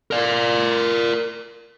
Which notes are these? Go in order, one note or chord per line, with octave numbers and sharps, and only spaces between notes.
A#4 D5